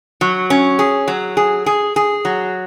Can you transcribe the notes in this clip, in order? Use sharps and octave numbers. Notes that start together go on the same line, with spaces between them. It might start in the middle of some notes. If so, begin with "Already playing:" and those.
F#3
C#4
G#4
F#3
G#4
G#4
G#4
F#3